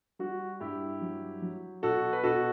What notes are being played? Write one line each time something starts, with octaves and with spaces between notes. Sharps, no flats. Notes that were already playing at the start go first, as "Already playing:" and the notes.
G3 F#4
G2 E4 G4
F#3
F#3
B2 F#4 A4
B4
B2 F#4 A4